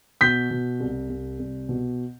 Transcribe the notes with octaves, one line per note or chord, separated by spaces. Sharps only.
B2 G6 B6
B2
C2
C2
C2
B2